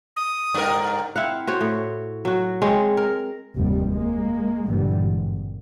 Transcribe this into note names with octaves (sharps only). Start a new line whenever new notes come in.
D#6
G2 A#4
C4 E4 F5 F#5
F#4 C5 C#5
A2
F#3 F#4
G#3 C4 C#5
A#4
F1 D#2 G#2 G3
G#3 A#3
G#1 G2 A#2 D3 E3 G3
G#1